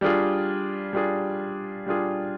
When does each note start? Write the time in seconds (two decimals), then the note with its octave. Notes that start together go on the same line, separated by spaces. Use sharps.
0.01 G3 D4 F4 G#4
0.93 G3 D4 F4 G#4
1.86 G3 D4 F4 G#4